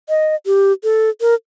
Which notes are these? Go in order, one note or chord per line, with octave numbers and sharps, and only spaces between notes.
D#5
G4
A4
A#4